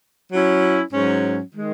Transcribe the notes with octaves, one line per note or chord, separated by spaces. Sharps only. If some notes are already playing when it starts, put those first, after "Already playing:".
F#3 C#4 E4
G#2 F#3 C#4
D#3 G#3